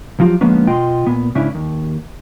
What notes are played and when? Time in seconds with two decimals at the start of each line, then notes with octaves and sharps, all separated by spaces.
0.20 F3 F#3 F4 G4
0.41 D3 F3 G#3 A#3 B3 C#4
0.67 B2 F4 D#5 G5 C6
1.07 A#2 B3
1.35 G#2 C#3 C#4 D4 E4
1.55 D#2